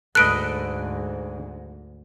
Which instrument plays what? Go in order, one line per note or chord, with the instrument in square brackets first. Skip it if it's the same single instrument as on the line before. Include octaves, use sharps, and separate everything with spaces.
[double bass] D2 G#2 [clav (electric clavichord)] A4 B4 D#5 [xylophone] F#6 D7